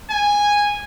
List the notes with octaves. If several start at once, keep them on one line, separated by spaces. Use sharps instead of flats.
G#5